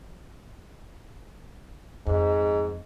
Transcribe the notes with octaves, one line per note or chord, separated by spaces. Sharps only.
F2 G#2